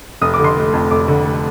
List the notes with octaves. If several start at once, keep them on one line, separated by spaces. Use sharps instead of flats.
F1 D#6
D6
D3
C6
A3
F2
F1 D6
D3
A3